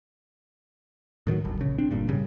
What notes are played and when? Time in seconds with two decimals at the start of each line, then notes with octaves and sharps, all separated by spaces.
1.27 A2 D#3 E3 F#3
1.44 D1 G1 G2
1.60 A#1 C#3
1.78 C4 D4
1.91 G1 G2 A#2
2.08 A1 G2 C#3 G3